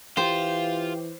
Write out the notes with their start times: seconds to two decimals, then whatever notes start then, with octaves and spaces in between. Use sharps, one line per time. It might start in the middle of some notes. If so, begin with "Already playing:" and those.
0.17 E3 F4 G4 C5